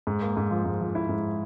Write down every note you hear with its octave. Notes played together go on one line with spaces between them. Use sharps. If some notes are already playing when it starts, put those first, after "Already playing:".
G#2
A#3
G#2
F3
G#2
F3
E4
G#2